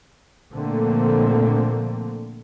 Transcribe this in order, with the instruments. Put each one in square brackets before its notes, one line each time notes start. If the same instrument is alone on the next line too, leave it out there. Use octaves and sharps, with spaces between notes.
[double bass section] A#2 D3 F3 A3 A#3 C4